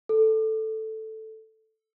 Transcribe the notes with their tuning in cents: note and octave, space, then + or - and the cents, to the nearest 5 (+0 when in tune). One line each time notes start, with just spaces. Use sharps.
A4 +0